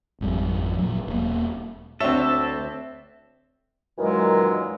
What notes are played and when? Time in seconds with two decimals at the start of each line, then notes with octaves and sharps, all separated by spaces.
0.21 G#1 F2 G3
0.78 A#2 F#3
1.07 E1 A#3
2.00 D2 C4 D4 F#4 A4 C#5 E5
3.99 F#2 A#2 D#3 E3 F#3 G#3